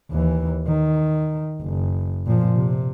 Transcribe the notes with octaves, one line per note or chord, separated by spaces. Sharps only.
D#2 E3
D#3
F#1
A#2 F3
C3